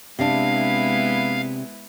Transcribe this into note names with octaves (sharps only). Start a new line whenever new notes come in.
C3 G#3 B3 D4 E4 F5